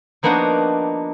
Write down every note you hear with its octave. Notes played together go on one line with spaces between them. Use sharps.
F3 A#3 B3 D4 D#4 F#4